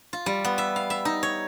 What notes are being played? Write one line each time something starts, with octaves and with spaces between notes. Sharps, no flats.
F4
G3
B3
E5
F5
E5
D#4
C#5